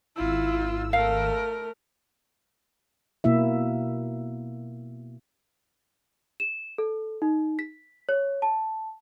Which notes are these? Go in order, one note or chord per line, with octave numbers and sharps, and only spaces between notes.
G#1 E4 F4 E6
A3 A#4 F5
B2 A#3 E4 E5
E7
A4
D#4
B6
C#5
A5